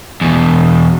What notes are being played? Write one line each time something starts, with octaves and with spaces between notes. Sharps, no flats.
E2 B2